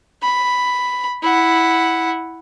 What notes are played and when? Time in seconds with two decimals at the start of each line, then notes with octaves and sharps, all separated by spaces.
0.23 B5
1.22 E4 F#5